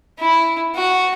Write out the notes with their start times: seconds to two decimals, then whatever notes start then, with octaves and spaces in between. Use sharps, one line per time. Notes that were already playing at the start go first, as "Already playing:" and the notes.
0.19 E4
0.75 F#4